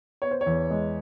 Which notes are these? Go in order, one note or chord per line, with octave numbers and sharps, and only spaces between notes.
B3 C#5
C5
C#5
E2
G#3